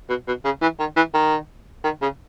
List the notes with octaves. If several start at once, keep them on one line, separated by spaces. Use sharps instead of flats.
B2
B2
C#3
E3
D#3
E3
D#3
D#3
C#3